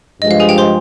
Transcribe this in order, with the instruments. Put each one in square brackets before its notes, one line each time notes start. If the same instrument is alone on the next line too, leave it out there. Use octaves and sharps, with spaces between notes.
[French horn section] G2 F3 G#3 [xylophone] D#5
[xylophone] F5
G#4 G#5
G4 G5
C5 C6